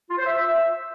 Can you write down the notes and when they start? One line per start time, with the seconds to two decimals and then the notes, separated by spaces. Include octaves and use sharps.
0.10 F4
0.18 C5
0.26 E5